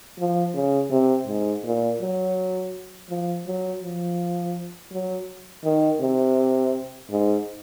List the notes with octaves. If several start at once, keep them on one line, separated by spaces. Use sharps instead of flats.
F3
C#3
C3
G#2
A#2
F#3
F3
F#3
F3
F#3
D#3
C3
G#2